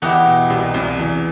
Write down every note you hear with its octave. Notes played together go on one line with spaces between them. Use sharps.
E2 E3 E4 G4 D#5 F#5
B2
C2 C3
C2 C3
E2 E3